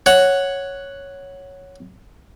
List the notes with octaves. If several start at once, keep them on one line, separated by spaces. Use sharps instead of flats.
C#5 F#5